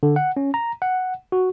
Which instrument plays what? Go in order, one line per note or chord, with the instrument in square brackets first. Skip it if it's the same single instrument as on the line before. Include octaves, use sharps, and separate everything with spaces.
[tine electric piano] D3
F#5
C#4
A#5
F#5
F#4